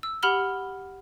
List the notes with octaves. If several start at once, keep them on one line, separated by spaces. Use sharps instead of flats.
E6
G4 F#5 B5 F6 G7